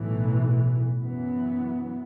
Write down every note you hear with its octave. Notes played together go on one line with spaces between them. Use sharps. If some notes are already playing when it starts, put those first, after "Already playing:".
Already playing: B1 A2 E3
F#2 E3 B3